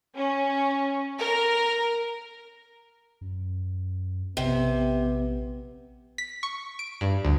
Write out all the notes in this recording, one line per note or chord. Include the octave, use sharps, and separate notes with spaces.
C#4
A#4
F#2
A#1 C3 B3
B6
C#6
D7
G2
D2